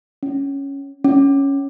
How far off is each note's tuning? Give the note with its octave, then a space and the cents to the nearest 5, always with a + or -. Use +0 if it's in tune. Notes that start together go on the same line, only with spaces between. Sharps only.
C#4 +0
C#4 +0